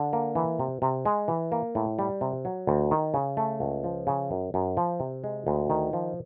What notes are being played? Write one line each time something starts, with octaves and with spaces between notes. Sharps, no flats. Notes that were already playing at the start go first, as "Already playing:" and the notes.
Already playing: D3
A#3
E3
C3
C3
G#3
E3
A#3
A2
G3
C3
F#3
D2
D#3
C#3
A3
C#2
F3
C#3
F#2
F#2
F3
C3
G#3
D2
D#3
F3